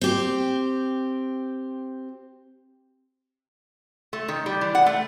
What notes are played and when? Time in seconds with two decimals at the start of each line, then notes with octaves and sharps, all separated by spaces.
0.01 C4 G4
4.13 A3
4.28 D#3
4.46 G3
4.61 E3
4.75 F#5
4.86 A3